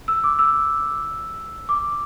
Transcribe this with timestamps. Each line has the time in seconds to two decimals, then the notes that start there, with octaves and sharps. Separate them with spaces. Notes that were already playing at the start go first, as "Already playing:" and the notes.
0.08 E6
0.24 D6
0.39 E6
1.69 D6